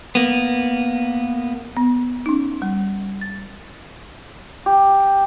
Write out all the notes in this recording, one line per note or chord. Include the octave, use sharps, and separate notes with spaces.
A#3 B3
B3
C#4 D#4
G3
A6
G4